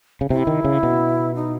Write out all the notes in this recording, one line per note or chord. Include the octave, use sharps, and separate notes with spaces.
C#3
C3 E4
D#3
C#3
B2
D#4